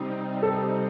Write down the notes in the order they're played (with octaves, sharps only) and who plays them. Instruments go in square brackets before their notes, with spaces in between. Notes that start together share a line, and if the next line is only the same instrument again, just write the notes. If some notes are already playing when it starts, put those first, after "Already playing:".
Already playing: [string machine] C3 G3 C4 D#4
[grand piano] A4